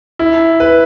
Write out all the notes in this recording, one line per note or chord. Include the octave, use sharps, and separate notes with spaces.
E4
B4